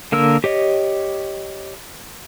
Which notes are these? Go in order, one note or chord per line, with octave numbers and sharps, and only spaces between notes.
D3 A#3 A#4 E6
G4 C#5 D#5